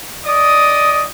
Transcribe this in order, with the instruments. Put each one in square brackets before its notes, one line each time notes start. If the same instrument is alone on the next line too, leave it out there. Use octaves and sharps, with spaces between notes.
[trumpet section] D5 D#5 D#6